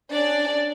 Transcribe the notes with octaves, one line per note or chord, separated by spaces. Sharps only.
C#4 D4 G#4 D5